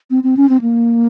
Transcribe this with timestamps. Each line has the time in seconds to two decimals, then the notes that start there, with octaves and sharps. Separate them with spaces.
0.11 C4
0.23 C4
0.37 C#4
0.49 C4
0.61 A#3